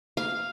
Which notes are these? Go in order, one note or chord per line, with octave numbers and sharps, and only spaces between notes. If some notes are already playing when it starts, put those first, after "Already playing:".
F5